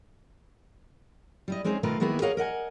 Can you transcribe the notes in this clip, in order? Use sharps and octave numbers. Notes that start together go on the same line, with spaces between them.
G3 E4 D#5
G#3 C4 C#4 D#4 G#4
B2 D#3 A3 F4 A#4 B4
D#3 G#3 A#3 B3 E4 G#4
G#4 A#4 C#5 D#5 F5 F#5
A#4 D#5 F#5 G#5